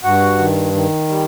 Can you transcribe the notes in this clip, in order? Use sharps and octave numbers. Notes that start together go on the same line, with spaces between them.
G2 F#4 F#5
D#3
D#3
G3